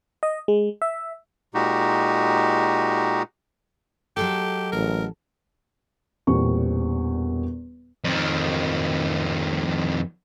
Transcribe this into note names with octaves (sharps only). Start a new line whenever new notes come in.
D#5
G#3
E5
A#2 G#3 D#4 F#4 G4
F#3 G#3 G4 A4
A1 A#4
E1 E2 A#2 G3 C4 C#6
F2 D#3